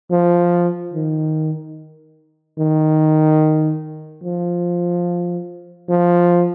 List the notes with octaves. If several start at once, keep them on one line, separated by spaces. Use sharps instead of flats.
F3
D#3
D#3
F3
F3